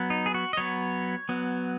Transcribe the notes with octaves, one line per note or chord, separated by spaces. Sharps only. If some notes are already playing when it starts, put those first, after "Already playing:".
Already playing: F#3 B3
D#4
G#4
F#4
D#5
F#3 B3 C#5
F#3 B3